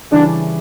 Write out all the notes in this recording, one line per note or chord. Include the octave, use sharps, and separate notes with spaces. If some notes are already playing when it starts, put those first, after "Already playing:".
C#3 E3 G3 C#4 D4 E4